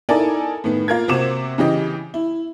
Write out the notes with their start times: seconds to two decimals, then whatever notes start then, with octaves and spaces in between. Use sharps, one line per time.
0.09 D#4 E4 A4 A#4 D5 G#5
0.64 A2 D#3 B3
0.88 A#3 F4 A#4 G#6
1.08 C3 A#3 F#4 C5 D6 E7
1.58 C#3 E3 G4 D#5
2.14 E4